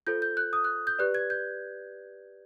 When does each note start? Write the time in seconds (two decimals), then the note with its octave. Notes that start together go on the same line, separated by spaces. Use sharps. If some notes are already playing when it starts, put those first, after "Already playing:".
0.07 F4 A4 C5 G6
0.22 G6
0.37 F#6
0.53 D#6
0.64 F#6
0.87 G6
0.99 G4 B4 D5 F#6
1.15 G#6
1.30 G6